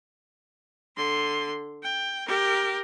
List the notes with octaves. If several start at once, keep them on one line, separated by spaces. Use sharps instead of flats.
D3 C6
G5
G4 A#4